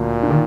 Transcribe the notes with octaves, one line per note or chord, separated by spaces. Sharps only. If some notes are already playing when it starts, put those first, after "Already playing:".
Already playing: D2 A#2
D3
D#3